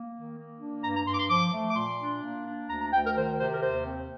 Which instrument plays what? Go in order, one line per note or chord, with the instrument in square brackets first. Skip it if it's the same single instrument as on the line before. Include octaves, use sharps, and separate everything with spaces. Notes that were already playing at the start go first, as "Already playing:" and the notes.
Already playing: [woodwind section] A#3
D#3
A#3
D4
G2 A#5
A#5
G2 C6
D6
C6
F3 D6
A3
D6
A#2 C6
D4
A#3
D4
D2 A#5
A#5
D2 G5
A#4
D#3 C5
C3 C5
A#4
D#2 C5
C4